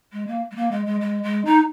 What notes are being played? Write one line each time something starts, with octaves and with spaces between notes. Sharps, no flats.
G#3
A#3
G#3
A#3
G#3
G#3
G#3
G#3
D#4